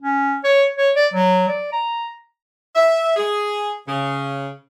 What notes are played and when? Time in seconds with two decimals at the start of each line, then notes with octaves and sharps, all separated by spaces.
0.02 C#4
0.44 C#5
0.77 C#5
0.96 D5
1.14 F#3
1.48 D5
1.72 A#5
2.76 E5
3.17 G#4
3.86 C#3